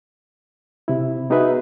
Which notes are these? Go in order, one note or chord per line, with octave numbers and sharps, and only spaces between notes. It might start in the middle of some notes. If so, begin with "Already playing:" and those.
C3 E4
B3 D#4 F#4 G#4 B4 E5